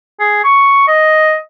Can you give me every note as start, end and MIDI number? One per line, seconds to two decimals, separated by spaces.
0.20 0.39 68
0.44 0.83 85
0.88 1.35 75